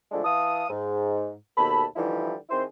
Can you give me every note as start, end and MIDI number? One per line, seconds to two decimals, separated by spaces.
0.12 0.22 50
0.12 0.22 53
0.12 0.22 56
0.12 0.22 57
0.12 0.22 62
0.24 0.63 52
0.24 0.63 77
0.24 0.63 81
0.24 0.63 87
0.70 1.32 44
1.57 1.84 39
1.57 1.84 47
1.57 1.84 69
1.57 1.84 81
1.57 1.84 83
1.96 2.34 50
1.96 2.34 52
1.96 2.34 53
1.96 2.34 55
1.96 2.34 63
1.96 2.34 64
2.49 2.63 51
2.49 2.63 60
2.49 2.63 64
2.49 2.63 68
2.49 2.63 72